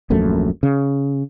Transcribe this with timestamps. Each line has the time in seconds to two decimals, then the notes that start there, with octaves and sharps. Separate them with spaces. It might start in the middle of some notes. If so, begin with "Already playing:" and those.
0.10 D#1 A#1 F#2 A3
0.63 C#3